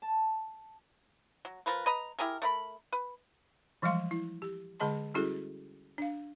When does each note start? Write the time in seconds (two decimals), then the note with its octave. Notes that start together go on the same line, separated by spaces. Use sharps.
0.02 A5
1.45 F#3
1.66 F3 A#4 B4
1.86 B4 D#5 A#5
2.19 E4 G4 G#4 A#4
2.42 A3 A#4 B5
2.92 B4
3.82 E3 F3 G3 G#3 F5 C6
4.11 E4
4.42 G4
4.80 D3 G#3 G#4 D#5 A5 C6
5.14 G3 C#4 E4 F#4 G#4 A4
5.98 D4 F5